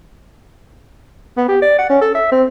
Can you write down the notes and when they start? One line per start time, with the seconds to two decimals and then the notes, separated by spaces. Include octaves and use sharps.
1.37 B3
1.48 G4
1.62 D5
1.79 F#5
1.90 C#4
2.01 A4
2.15 E5
2.32 C4